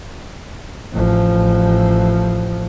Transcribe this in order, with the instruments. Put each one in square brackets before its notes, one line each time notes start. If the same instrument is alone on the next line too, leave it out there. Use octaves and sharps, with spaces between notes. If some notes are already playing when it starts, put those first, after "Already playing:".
[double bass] A1 F3